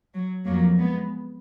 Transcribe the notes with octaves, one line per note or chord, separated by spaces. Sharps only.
F#3
F2 F3 F#3 A#3
G#3 B3